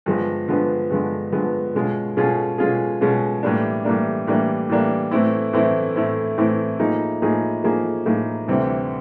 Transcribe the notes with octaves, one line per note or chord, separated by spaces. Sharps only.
G2 D3 F3 G#3 B3
G2 D3 F3 G#3 B3
G2 D3 F3 G#3 B3
G2 D3 F3 G#3 B3
B2 G#3 C#4 F4 G#4
B2 G#3 C#4 F4 G#4
B2 G#3 C#4 F4 G#4
B2 G#3 C#4 F4 G#4
A2 E3 G3 A#3 D4
A2 E3 G3 A#3 D4
A2 E3 G3 A#3 D4
A2 E3 G3 A#3 D4
A2 E3 A3 C4 E4
A2 E3 A3 C4 E4
A2 E3 A3 C4 E4
A2 E3 A3 C4 E4
A2 F3 A#3 D#4 G#4
A2 F3 A#3 D#4 G#4
A2 F3 A#3 D#4 G#4
A2 F3 A#3 D#4 G#4
D2 C3 E3 G3 C4